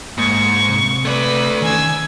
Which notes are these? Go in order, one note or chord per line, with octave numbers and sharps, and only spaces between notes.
G#2 A#3 C#6
C3
A3 B4 D5
D#3 E3 C#4 G#5 E6